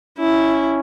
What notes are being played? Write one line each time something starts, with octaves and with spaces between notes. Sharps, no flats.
C#4 E4